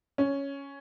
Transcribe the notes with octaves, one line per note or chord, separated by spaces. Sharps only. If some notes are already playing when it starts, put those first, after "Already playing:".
C#4